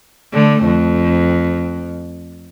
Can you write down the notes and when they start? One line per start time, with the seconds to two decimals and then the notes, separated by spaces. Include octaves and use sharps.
0.33 D3 A3
0.64 F2